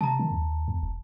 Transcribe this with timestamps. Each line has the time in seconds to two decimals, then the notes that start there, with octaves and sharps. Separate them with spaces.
0.01 C3 A5 A#5
0.19 D#3
0.32 D#2
0.68 E2
0.83 E1